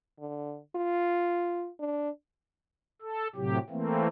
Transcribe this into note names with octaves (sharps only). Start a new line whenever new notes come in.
D3
F4
D4
A4
A2 C3 F#3 G4
E3 A3 A#3 C4